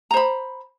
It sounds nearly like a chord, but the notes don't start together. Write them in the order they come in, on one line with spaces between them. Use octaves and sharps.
A#5 C5 B5